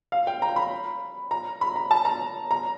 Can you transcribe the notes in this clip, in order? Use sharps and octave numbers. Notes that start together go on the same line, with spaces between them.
F5
G5
A#5
B5
A#5
B5
A#5
A5
A#5
A#5